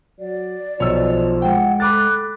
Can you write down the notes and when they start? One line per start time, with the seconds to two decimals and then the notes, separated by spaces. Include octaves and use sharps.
0.19 F#3 D5
0.80 B1 F3 C#5 E6
1.42 G#3 F#5 G5
1.80 A4 B5 D6 F#6 A6